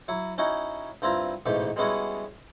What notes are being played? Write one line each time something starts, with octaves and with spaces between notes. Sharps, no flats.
F#3 E4
C#4 D#4 E4 F#4
G2 C4 E4 F4 A#5
A1 G#2 B2 A3 G4
G3 G#3 B3 C#4 E4 F#4